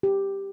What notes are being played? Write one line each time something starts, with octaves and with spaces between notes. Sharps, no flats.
G4